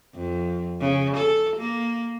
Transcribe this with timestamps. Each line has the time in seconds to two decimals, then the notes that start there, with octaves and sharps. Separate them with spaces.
0.15 F2
0.80 C#3
1.17 A4
1.57 A#3